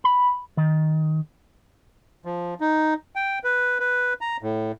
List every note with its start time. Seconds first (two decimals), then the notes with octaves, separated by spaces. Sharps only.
0.04 B5
0.57 D#3
2.25 F3
2.60 D#4
3.16 G5
3.44 B4
3.80 B4
4.21 A#5
4.42 A2